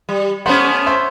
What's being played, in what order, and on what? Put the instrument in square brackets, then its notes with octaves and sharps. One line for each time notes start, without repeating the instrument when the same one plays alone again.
[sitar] G3
[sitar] A3 B3 C#4 [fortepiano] C5 F#5 B5
[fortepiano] C5 E5